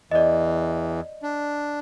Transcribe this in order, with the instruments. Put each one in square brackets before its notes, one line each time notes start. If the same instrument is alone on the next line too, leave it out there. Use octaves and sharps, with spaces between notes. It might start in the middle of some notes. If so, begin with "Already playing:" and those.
[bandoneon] E2 E3 [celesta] D5 D#5
[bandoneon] D4